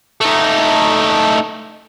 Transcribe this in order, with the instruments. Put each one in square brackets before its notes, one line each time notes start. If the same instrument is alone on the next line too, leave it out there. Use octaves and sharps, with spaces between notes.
[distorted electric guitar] A3 D#4